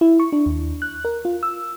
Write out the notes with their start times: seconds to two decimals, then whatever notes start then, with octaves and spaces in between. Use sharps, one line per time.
0.01 E4
0.20 C#6
0.32 D4
0.46 D#2
0.82 F#6
1.05 A#4
1.25 F4
1.43 E6